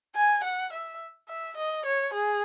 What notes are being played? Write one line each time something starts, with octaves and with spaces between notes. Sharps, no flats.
G#5
F#5
E5
E5
D#5
C#5
G#4